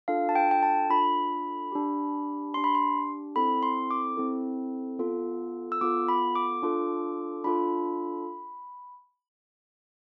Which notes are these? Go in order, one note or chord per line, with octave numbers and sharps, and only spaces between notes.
D4 F4 A4 F5
A5
G5
G5
A5
D4 F4 A4 B5
D4 G4
D4 G4 C6
B5
C6
C4 E4 A4 B5
C6
D6
C4 E4 A4
B3 F4 A4
E6
B3 F4 A4 D6
B5
D6
D4 F4 A4
D4 F4 A4 B5